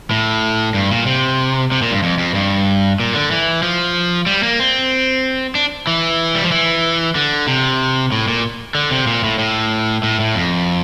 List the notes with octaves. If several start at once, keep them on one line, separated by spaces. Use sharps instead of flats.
A2
G2
A#2
C3
C3
A#2
G2
F2
F2
G2
A#2
D3
E3
F3
G3
A#3
C4
D4
E3
G3
F3
E3
D3
C3
A2
A#2
D3
C3
A#2
A2
A2
A2
A2
F2